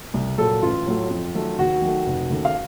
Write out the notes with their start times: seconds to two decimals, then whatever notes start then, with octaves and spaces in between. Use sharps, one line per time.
0.14 C2
0.38 A#2 F#3 A4
0.62 A1 F4
0.86 A2 F#3 A3
1.10 F2
1.34 D#3 F#3 A3
1.59 D#2 F#4
1.82 D#3 F#3 A3
2.06 F1
2.30 D#2 C#3 A3
2.45 F5